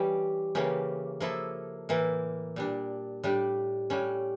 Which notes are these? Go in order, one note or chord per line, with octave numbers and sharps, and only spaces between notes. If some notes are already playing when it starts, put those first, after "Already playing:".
Already playing: E3 G3 C#4 G4
C#3 E3 A#3 C#4 G4
F3 A#3 E4 A4
A2 E3 A#3 E4
A#2 G3 D4
A2 G3 D4 G4
A2 G3 C#4